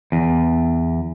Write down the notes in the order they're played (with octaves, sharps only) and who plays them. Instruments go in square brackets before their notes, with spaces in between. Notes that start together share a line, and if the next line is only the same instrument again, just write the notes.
[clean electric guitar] E2